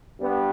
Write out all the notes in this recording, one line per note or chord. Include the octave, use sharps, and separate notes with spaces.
G2 G3 B3